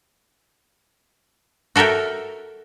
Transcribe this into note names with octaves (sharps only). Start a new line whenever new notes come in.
F#4 A4 A#4 E5 G5